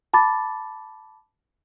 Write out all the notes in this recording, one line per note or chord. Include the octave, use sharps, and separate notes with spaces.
A5 B5 D6 A6